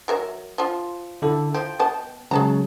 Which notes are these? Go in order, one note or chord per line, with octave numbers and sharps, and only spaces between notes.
F#3 A#4 E5
F3 F4
D3 E4 A4
F3 G5
B3 D#5 A5
C#3 F#3 G#3 G#4 A5 A#5